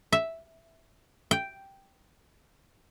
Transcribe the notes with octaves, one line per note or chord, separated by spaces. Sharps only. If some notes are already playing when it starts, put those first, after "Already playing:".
E5
G5